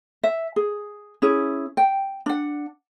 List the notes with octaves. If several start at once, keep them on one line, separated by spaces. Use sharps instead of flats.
E5
G#4
C#4 E4 G#4
G5
D4 F#5